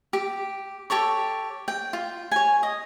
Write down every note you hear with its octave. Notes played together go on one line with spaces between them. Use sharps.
G4
G4 A4 C#5 C#6
G5
F4
C#5 G#5
D#5